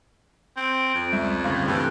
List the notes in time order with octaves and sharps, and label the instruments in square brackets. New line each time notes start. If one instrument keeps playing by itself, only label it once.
[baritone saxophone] C4 [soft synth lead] D7
[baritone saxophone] F2
[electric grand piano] C#2 E5 [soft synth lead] G3
[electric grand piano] D2 G2 C#3 [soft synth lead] F5
[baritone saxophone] G2 [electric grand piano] C3 E3 A3 [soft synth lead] F#6